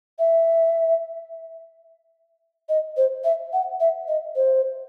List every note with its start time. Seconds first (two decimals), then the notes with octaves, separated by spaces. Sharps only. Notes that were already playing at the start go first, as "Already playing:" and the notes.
0.19 E5
2.69 D#5
2.97 C5
3.24 E5
3.53 F#5
3.80 E5
4.08 D#5
4.36 C5